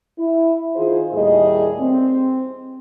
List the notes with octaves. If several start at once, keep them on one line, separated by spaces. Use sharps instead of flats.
E4
D#3 F4 G#4 C5
D#2 A2 G3 G#4 D#5
C4